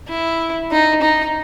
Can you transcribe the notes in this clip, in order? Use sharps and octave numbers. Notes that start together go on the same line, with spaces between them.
E4
D#4
D#4